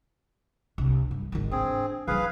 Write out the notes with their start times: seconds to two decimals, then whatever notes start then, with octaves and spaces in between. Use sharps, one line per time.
0.78 C2 D4
1.11 G2
1.32 G#1 D#3
1.51 C4 D4 G#4
2.07 E3 F#3 G#4 B4 F5